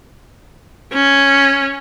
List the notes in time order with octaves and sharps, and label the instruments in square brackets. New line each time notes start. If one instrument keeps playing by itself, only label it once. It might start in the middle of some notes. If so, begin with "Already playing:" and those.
[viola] C#4